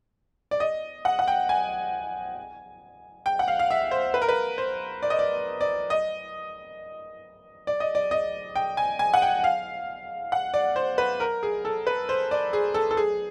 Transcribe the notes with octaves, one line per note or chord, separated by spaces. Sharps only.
D5
D#5
F#5
F#5
G5
G#5
G5
F#5
F5
F5
E5
C5
B4
A#4
B4
C5
D5
D#5
D5
D5
D#5
D5
D#5
D5
D#5
G5
G#5
G#5
F#5
G5
F5
F#5
D5
C5
B4
A#4
G#4
A4
B4
C5
D5
G#4
A4
A4
G#4